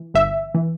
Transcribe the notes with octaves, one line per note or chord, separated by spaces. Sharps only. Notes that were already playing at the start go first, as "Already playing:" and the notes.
Already playing: E3
G1 E5
E3